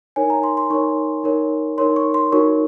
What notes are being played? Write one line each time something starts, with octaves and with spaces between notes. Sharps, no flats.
D#4 A#4 C#5 G#5
A#5
C6
C6
D#4 A#4 C#5 C#6
D#4 A#4 C#5
D#4 A#4 C#5 C6
C#6
C6
D#4 F#4 A#4 C#5 C#6